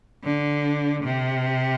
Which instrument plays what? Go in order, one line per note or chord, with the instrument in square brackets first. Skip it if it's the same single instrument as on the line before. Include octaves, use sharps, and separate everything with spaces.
[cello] D3
C3